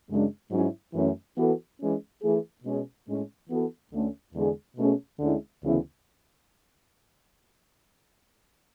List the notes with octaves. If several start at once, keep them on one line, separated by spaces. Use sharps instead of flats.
F#2 C#3 G#3 D4
G#2 F#3 C#4 E4
F#2 E3 A3 C#4
E3 B3 F#4 A4
E3 G#3 C#4
E3 A3 E4 G#4
B2 G#3 C#4 G#4
A2 G#3 C#4
E3 B3 F#4 A4
D2 D3 A3 C#4
E2 D3 G#3 D4 G#4
B2 A3 C#4 G#4
D2 D3 G#3 C#4 E4
D2 C#3 E3 B3 E4